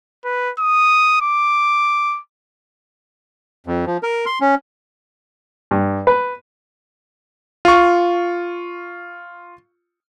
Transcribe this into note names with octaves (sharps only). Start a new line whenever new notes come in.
B4
D#6
D6
F2
F3
A#4
C6
C#4
G2
B4
F4 C#6